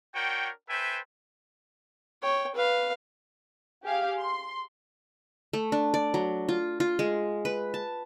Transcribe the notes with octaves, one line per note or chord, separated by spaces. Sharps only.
D4 F#4 A#4 C#5 G5
A4 B4 C5 E5 G5 G#5
C#5 G5
B4 F5
G4 G#4 F5
C6
A3
D4
D5
F#3
F4
F4
G#3
B4
A5